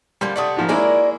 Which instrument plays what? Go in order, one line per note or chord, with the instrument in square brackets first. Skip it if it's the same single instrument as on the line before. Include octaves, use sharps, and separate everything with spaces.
[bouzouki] D3 F3 A#3 [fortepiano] G3
[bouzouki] C3 A3 F#5 [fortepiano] D5 D#6
[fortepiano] G#2 F3 A#3
[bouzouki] F#3 A#4 D5 [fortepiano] G#3 A#3 E4